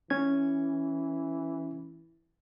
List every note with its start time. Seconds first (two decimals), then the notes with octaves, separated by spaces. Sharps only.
0.10 E3 C#4 G#6